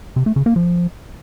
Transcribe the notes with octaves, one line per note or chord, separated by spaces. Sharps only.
C3
A3
C#3
A#3
F3